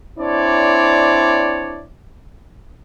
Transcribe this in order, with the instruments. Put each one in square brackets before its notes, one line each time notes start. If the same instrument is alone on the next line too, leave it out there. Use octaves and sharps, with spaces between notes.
[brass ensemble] C4 D4 E4 C#5 D5